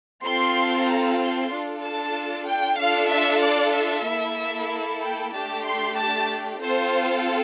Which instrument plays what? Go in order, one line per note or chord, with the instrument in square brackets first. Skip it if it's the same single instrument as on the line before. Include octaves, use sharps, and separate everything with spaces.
[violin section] C4 F4 A4 C6
A#5
C6
D4 F4 A4
A5
G5
D4 F4 A4 F5
E5
D5
E5
A#3 E4 A4
G5
A3 D4 G4 A5
C6
A5
C4 F4 A4 C5